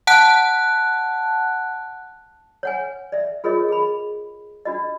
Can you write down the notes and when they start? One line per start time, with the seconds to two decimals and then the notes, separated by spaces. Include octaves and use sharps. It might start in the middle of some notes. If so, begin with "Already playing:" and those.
0.07 F#5 A5 F#6
2.63 C#5 F#5 G#5
3.12 D5 E5
3.44 F4 G#4 A#4 C#5 D#5
3.69 G#4 B5
4.65 D4 F#4 D#5